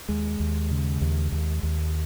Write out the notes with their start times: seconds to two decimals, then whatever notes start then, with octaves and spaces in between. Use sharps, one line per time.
0.09 D#2 G#3
0.40 D#2
0.71 C#3
1.01 D#2
1.32 D#2
1.63 D#2